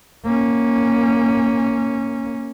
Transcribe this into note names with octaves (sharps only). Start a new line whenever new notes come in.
A#3 C#4